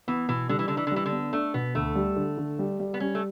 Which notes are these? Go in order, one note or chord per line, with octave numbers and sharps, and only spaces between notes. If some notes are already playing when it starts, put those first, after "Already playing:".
E3 B3
B2 E3
D3 G3
E3
D3 D4
E3
D3
E3 G3
D3
B3
A3 D4
B2 B3
D2 A3
G3
D3
D3
G3
G3
B3
G3 C#4
A3